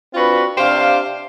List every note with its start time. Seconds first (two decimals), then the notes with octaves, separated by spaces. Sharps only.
0.15 C4 D4 F4 F#4 B4
0.58 C3 D4 G4 C5 F5